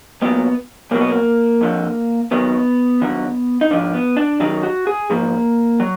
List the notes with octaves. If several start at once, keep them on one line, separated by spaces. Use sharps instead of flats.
B1 A#2 F#3 B3
B1 B2 F#3 A#3
B3
A#3
F2 D3 F3
D#2 D#3 F#3 B3
D#2 D3 F#3
D#4
G#2 F3 D4
B3
D4
F#2 D#3 F#3 D#4
F#4
G#4
G#2 F3 A#3
F#3